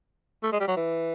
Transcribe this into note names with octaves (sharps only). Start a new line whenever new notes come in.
A3
G#3
G3
F#3
E3